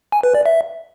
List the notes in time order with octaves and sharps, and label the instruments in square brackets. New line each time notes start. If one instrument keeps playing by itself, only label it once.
[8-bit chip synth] G#5
B4
D5
E5